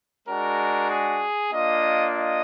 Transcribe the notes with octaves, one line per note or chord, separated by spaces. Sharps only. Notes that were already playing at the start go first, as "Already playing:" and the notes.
G#3 D4 F#4 A#4
G#4
A#3 D4 F4 D#5
D#5